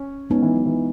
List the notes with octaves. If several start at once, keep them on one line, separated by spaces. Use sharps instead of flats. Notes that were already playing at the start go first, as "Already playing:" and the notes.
Already playing: C#4
G#3 B3 C#4 D#4
E3
F#3
E3